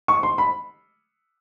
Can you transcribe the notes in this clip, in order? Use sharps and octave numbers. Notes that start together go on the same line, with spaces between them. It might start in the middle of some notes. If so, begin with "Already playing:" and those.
C#6
C6
B5